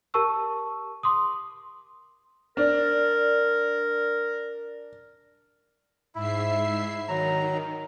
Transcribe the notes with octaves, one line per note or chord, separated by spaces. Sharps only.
G4 A#4 A5 C#6 E6
C6 D6 D#6
D4 A#4
G#2 E4 E5 C7
D#3 F#3 A#5